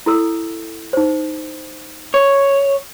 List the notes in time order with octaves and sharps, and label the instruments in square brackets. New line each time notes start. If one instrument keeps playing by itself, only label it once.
[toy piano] E4 A4 E6
D#4 C5
[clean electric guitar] C#5